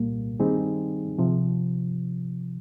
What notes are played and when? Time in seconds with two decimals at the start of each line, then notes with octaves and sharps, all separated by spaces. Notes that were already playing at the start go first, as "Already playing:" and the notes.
Already playing: C2 A#2 G3 A#3
0.40 D#3 G3 C4 D#4 G#4
1.18 C3 F3